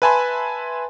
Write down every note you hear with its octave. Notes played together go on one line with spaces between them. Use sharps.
B4 E5 G#5 A5 B5 C6